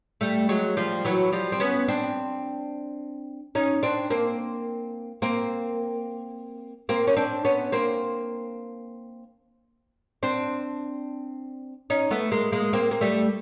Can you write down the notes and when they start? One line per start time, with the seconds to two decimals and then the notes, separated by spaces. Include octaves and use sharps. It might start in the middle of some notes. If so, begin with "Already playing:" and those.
0.21 G3 A3
0.49 F#3 G#3
0.77 F3 G3
1.05 E3 F#3
1.32 F3 G3
1.52 C4
1.60 B3 C#4
1.88 C4 D4
3.55 C#4 D#4
3.83 C4 D4
4.10 A#3 C4
5.22 A#3 C4
6.89 A#3 C4
7.07 C#4
7.17 C4 D4
7.45 B3 C#4
7.72 A#3 C4
10.23 C4 D4
11.90 C#4 D#4
12.11 A3 B3
12.32 G#3 A#3
12.52 G#3 A#3
12.73 A#3 C4
12.91 A#3
13.01 G3 A3